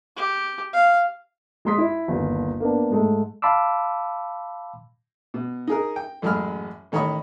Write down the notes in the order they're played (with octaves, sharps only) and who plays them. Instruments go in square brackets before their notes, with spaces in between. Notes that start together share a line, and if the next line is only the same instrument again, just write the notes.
[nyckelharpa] G4
F5
[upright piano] G#3 G#4 C6 D#6 B6
E4
G1 D#2
A#3 B3 D4
G#2 G#3 A3
[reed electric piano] F5 A5 B5 C6 D6 E6
[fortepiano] B2
D#4 G#4 A#4
G5
A1 F#2 G#3 G#4 B5 F6
A1 D#3 C#5 D#5 B5 C#6